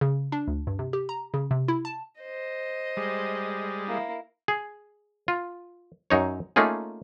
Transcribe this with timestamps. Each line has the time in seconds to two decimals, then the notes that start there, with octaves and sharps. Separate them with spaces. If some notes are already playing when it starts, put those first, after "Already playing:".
0.01 C#3
0.32 D4
0.48 D2
0.67 G2
0.79 C3
0.93 G4
1.09 A#5
1.34 C#3
1.51 C3
1.68 E4
1.85 A5
2.21 C5 D#5
2.97 G3 G#3
3.88 A#3 E4
4.48 G#4
5.28 F4
6.10 F#2 D#4 C#5
6.56 A3 A#3 C#4 D#4 F4 G#4